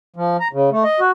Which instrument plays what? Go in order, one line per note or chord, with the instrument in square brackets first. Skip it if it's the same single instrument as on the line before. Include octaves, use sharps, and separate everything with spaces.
[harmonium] F3
A#5
C#3
A3
D#5
F#4